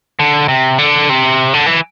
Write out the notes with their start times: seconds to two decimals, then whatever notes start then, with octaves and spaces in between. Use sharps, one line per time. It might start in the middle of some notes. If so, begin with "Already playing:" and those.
0.19 D3
0.48 C3
0.78 D3
1.09 C3
1.54 D3
1.66 E3